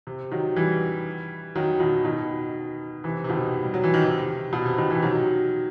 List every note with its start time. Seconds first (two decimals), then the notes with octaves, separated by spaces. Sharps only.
0.07 C3
0.31 D#3 F#3
0.56 E3 G3
1.56 D#3 F#3
1.80 B2 D#3
2.05 B2 D#3
3.04 C3 E3
3.24 C3
3.29 B2 D#3
3.63 G3
3.74 F#3
3.84 E3
3.94 D#3
4.03 C3
4.53 B2
4.65 C3
4.78 B2 D#3
4.90 C3 E3
5.03 D#3 F#3